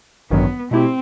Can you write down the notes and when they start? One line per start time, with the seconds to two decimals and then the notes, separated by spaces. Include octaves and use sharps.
0.31 A1 G2 D#3 F#3 B3
0.71 B2 A3 C4 E4 G4